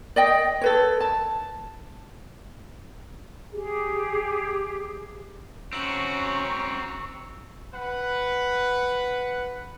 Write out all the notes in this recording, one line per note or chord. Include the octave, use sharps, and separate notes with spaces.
D5 D#5 G5
A4 B4 C#5
A5
G4 G#4
C4 C#4 F#4 A#5 C#6 E6 C#7 F#7
B4 F#5